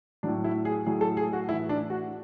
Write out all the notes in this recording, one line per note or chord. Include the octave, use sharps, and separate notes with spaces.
A2 F#3 D4
E4
G#4
A2 F#3 G#4
A4
G#4
F#4
A2 E3 E4
D4
F#4